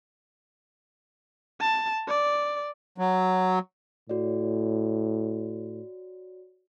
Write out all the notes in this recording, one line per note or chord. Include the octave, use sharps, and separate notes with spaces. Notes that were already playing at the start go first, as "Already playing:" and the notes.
A5
D5
F#3
A2 F#4 C#5 D5